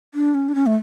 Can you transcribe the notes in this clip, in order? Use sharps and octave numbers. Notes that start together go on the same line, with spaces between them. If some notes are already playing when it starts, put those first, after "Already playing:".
D4
C#4
D4
C#4
A3